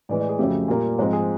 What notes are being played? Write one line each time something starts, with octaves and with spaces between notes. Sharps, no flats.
A2 E3 G#3 D5
D5
G#4
F2 C#3 F#3 A3 G4
A#2 G3 A#3
G#2 F3 G#3 C4
G#4